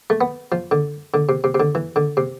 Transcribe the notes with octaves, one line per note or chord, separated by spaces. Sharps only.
A3
B3
F3
D3
D3
C3
C3
C3
D3
E3
D3
C3